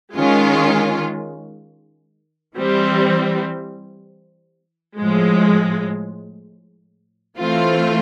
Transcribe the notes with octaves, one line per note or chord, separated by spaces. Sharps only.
D#3 G#3 C#4 F4
E3 G3 C4
A2 F3 G#3
E3 A3 C4 F4